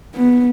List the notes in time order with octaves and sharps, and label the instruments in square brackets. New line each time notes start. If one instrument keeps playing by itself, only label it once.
[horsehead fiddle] B3